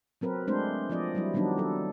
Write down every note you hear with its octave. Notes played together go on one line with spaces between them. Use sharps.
F#3 C4 A#4 B4
G#3 A3 C4 D4 C5
F3 C4 D5 D#5
F#3 G3 E4
D#3 F#3 G3 B3 D4 D#4
F#3 A4